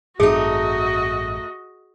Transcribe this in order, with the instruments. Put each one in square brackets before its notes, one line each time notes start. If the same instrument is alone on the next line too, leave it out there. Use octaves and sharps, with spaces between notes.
[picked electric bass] A1 G2 C4 [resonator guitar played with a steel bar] A3 D#4 [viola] F#4 D#5 [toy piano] G#4